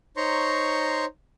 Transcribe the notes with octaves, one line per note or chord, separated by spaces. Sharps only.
D#4 C5 C#5 A#5 C6 C#6